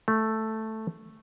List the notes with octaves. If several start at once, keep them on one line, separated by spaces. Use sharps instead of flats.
A3